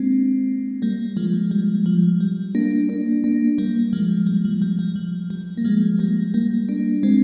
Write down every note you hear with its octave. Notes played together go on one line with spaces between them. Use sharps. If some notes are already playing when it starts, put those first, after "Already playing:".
Already playing: G#3 A#3 C4 D4
G3 A#3
F3 G#3
G3
F3
G3
A#3 D4
A#3 D4
A#3 D4
G3 A#3
F3 G#3
G3
F3
G3
G3
F3
G3
A#3
F3 G#3
G3 A#3
G3 A#3
A#3 D4
G#3 C4